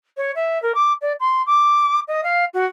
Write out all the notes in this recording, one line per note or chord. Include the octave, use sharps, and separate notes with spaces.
C#5
E5
A#4
D6
D5
C6
D6
D#5
F5
F#4